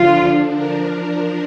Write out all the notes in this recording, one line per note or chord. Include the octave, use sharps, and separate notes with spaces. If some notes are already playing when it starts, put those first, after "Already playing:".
Already playing: D3 F3 D4 F4
F3 D4 A#4